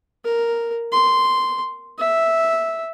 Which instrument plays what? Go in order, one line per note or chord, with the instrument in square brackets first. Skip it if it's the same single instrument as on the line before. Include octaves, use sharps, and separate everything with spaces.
[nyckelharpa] A#4
C6
E5